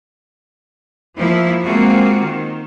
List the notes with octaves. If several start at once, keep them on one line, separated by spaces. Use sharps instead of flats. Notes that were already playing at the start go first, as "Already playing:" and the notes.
F3 A#3 E4
G#3 A#3 C4 F4 F#4
D#3